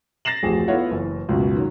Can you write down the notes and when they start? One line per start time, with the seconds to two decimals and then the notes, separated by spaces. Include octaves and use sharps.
0.25 A6 A#6 C7 E7 F#7
0.43 D1 A1 F2 G4 G#4
0.68 A3 B3 E4 F4 C#5 F#5
0.91 F#1 E3
1.29 C#2 F#2 B2
1.56 D#3 F#3